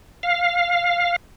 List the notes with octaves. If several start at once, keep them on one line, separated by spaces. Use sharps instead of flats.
F5